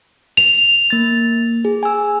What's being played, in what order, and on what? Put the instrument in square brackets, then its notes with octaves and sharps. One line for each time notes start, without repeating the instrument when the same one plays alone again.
[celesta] F7
[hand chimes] A#3 A6
G#4
G#5 E6